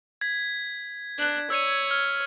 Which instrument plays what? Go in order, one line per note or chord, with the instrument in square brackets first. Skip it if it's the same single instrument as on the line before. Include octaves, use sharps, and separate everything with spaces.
[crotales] G#6 B6
[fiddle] D4 F#6
[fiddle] C#5 [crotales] E6 G#6 D#7
[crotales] F6